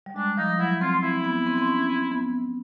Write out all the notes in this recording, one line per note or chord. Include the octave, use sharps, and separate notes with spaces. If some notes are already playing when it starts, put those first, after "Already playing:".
G3
G#3 D4
F3 D#4
F#3 E4
C4 F4
C4 E4
B3
C4
C4
C#4
C4
B3